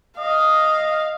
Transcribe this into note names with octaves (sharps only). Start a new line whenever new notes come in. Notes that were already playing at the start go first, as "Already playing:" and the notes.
D#5 F5